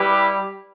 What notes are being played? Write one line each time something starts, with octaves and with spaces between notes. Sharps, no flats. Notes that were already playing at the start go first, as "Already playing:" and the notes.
Already playing: G3 E4 G4 B4